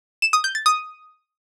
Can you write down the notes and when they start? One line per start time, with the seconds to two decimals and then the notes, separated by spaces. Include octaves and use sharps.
0.22 E7
0.33 D#6
0.44 G6
0.55 A6
0.66 D#6